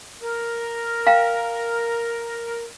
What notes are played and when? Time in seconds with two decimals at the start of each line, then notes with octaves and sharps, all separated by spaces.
0.22 A#4
1.07 F5 G5 A#5